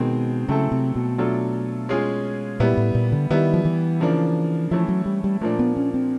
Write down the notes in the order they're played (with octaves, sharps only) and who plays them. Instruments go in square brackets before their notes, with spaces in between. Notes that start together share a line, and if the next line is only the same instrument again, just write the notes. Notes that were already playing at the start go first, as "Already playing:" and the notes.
Already playing: [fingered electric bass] B2 [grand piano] D#3 G#3 C4
[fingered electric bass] C#3 [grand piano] F#3 A3 C4 E4 A4
[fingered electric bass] C3
B2
[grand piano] F#3 A3 D4 F4 A4
G#3 C#4 F4 G#4
[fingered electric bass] A#2 [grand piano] G3 B3 E4
[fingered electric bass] A2
A#2
D3
[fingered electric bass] D#3 [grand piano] G3 B3 E4
[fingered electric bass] F3
E3
[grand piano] C#3 F3 A#3 D4
[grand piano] E3 A3 C#4 E4 [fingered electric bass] F3
[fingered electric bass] F#3
G3
G3
[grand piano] A#2 F3 A#3 D4 [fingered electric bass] A3
[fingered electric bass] B3
C#4
C4